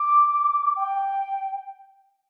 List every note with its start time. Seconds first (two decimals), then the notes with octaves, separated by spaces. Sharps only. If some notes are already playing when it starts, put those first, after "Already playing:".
Already playing: D6
0.76 G5